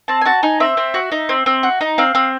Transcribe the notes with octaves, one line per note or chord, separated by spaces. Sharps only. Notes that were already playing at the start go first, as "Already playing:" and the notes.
C4 A5
G#5
F#4 A5
D#4 G#5
C4 E5
C4
F#4
D#4
C4
C4
F#4
D#4
C4 F5
C4